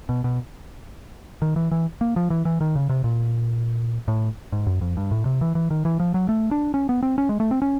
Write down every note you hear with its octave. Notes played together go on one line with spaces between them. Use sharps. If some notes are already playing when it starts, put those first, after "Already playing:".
B2
B2
D#3
E3
E3
A#3
F3
E3
E3
D#3
C#3
C3
A#2
A2
G#2
F#2
F2
G2
A2
C3
E3
E3
D#3
E3
F3
F#3
A3
D4
C#4
B3
C4
C#4
G#3
A3
C4
C#4